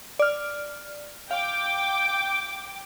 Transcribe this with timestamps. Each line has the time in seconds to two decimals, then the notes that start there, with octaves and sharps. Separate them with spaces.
0.19 D5 F6
1.31 F5 G5 D6